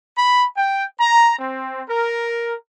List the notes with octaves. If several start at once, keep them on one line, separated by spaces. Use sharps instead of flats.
B5
G5
A#5
C4
A#4